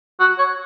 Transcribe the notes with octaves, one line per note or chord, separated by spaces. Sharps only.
F#4
C#5